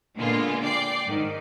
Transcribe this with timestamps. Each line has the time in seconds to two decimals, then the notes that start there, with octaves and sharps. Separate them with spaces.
0.17 A#2 D3 G#3 A#3 B3 F4
0.64 D5 G5 D6 C7
1.05 G#2 D#3